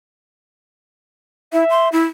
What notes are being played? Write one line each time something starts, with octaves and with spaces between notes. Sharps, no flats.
E4 E5
C6
E4